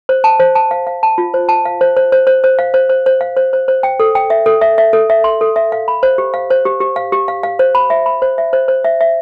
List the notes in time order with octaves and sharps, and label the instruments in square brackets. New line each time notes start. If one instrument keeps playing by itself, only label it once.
[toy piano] C5
A5
C5
A5
F5
F5
A5
F4
C5
A5
F5
C5
C5
C5
C5
C5
F5
C5
C5
C5
F5
C5
C5
C5
G5
A4
G5
E5
A4
E5
E5
A4
E5
C6
A4
E5
F5
B5
C5
G4
F5
C5
G4
G4
F5
G4
F5
F5
C5
B5
E5
B5
C5
E5
C5
C5
E5
E5